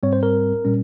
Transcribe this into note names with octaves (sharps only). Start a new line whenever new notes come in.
G#2 G3 C4 C#5
C5
A#4
A#2 G3 C#4